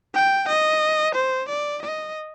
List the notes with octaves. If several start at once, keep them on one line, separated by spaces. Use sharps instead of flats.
G5
D#5
C5
D5
D#5